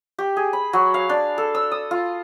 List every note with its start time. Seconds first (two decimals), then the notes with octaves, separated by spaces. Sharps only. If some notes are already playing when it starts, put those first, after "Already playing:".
0.18 G4
0.37 G#4
0.53 B5
0.73 F#3
0.94 F5
1.09 D4
1.38 A4
1.55 E6
1.71 D#6
1.91 F4